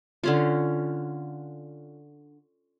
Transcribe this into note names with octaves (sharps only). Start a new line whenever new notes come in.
D3 C#4 F4